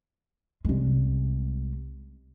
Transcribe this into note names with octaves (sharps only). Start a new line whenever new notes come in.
C2 G#3